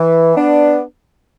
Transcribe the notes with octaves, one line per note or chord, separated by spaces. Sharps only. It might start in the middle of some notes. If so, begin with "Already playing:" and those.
Already playing: E3
B3 D4